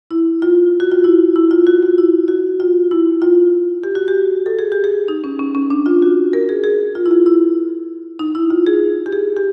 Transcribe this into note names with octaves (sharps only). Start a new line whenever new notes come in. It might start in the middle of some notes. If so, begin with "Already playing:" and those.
E4
F4
F#4
F4
E4
E4
F4
F#4
F4
E4
F#4
F4
E4
F4
G4
F#4
G4
A4
G#4
G4
G#4
D#4
C#4
C#4
C#4
D4
F4
F#4
A#4
G#4
G#4
F4
E4
F4
E4
D#4
E4
F4
G#4
G4
G#4
G4